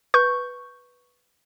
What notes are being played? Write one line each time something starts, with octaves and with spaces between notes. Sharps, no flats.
B4 C#6 G6